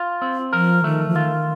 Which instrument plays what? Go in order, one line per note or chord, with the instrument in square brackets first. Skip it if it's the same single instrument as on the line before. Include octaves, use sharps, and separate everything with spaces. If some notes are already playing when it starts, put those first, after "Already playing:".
Already playing: [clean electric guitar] F4
C4
[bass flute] F3 [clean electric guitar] A#4
[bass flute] D#3 [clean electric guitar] A3
[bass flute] F3
[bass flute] D#3 [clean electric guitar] F4